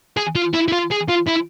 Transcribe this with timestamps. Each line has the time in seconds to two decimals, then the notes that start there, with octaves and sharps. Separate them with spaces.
0.17 G#4
0.35 F4
0.53 E4
0.68 E4
0.72 F4
0.91 G#4
1.09 F4
1.28 E4